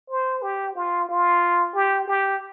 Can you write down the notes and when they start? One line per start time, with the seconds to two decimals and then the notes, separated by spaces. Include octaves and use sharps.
0.10 C5
0.42 G4
0.76 F4
1.09 F4
1.74 G4
2.08 G4